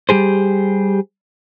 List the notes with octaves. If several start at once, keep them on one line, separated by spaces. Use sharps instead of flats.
G3 G4 G#4 C5